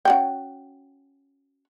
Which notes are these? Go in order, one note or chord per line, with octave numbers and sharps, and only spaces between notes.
C#4 F#4 G5